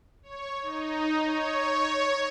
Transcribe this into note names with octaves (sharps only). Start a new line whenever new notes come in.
C#5
D#4
C#5